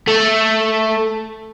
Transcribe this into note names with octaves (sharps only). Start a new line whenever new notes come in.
A3